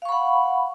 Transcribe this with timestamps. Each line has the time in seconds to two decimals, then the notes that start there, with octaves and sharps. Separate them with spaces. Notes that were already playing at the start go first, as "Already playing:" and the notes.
0.02 F5
0.05 C#6
0.09 B5
0.12 F#5